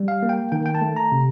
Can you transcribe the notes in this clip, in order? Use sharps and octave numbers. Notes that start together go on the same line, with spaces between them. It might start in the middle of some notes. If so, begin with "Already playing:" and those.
Already playing: G3
F5
A#3
G5
D#3 G5
G5
A5
A3
A#5
C3